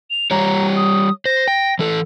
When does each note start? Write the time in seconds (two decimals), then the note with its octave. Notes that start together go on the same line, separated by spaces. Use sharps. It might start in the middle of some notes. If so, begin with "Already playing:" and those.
0.10 F7
0.31 G3 G4 C#5 A#5
0.76 D#6
1.25 C5 A#6
1.48 G5
1.79 E3 A4